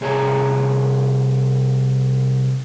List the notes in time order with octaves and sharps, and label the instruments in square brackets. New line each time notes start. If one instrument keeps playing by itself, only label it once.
[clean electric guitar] C2 G#4 C#5 A5 A#5